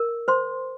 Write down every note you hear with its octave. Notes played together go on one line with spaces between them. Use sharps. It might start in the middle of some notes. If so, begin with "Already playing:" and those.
Already playing: A#4
C5 C6